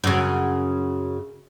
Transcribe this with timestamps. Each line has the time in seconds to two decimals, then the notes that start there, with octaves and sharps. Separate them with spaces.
0.04 F#2 C#3